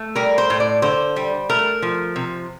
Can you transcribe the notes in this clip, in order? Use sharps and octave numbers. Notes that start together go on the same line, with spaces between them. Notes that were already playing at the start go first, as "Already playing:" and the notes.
Already playing: A3
G3 A#4
C5
A2
D5
D3 C5
G3
A3 A#4
F3
C3